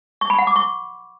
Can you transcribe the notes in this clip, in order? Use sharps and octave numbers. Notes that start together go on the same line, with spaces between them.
C#6
B5
F#5
D6
C#6